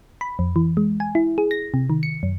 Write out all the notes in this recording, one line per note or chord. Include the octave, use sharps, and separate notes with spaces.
B5
F2
E3
G#3
G#5
E4
G#4
A#6
C3
D#3
C#7
F#2